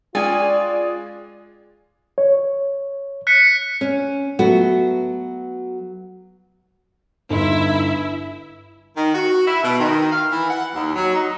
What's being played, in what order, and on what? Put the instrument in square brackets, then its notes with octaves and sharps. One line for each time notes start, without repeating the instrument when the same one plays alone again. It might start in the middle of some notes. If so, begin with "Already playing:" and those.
[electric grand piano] G#3 G#4 A6 [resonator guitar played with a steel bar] C#4 G5 G#5 [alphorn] F4 [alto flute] D5
[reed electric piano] C#5
[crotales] F#6 B6 C#7
[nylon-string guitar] C#4
F#3 A3 B3 F#4
[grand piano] G1 D#4 C6 [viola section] E4 E5
[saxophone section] D#3
F#4
E4
B2
D#3
F5
E3
F#5
D#2
F#3
D#4